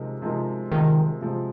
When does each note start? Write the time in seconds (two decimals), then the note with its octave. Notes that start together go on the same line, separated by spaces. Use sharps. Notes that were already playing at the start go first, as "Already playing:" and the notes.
Already playing: C3 F3 G#3 D#4 A#4
0.22 C3 F3 G#3 D#4 A#4
0.72 C3 D#3 F3 G#3
1.22 C3 F3 G#3